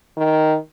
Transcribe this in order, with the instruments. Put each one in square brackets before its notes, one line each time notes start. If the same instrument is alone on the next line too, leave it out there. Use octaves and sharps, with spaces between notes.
[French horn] D#3